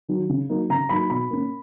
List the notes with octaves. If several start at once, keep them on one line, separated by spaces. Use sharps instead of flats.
D#3 F#3
C#3
F#3 A#3 D#4
C#3 A#5
F#3 A#3 D#4 B5
B2 B5
A#3 C#4